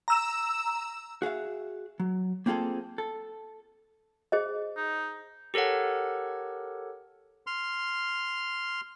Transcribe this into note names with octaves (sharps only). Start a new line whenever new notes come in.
A#5 E6 E7
F#4 G#4 E5 F5
F#3
A#3 C4 F4 G#4 A4
A4
G#4 C5 D#5
D#4
G4 A4 A#4 C#5 F#5
C6 F6